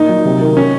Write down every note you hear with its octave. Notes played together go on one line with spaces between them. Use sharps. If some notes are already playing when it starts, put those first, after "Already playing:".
Already playing: A#2 D#4
F#3
C3
D#3
C#4